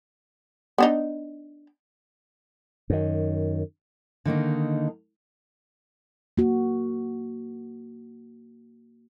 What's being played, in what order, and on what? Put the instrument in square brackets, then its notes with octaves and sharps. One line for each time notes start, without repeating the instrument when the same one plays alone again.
[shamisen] B3 D4 D#4
[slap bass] F#2 D#3
[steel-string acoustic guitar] D3 D#3 A#3 D#4
[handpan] A#3 F#4